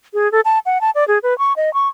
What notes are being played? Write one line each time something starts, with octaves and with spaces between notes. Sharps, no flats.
G#4
A4
A5
F#5
A5
D5
G#4
B4
C#6
D#5
C#6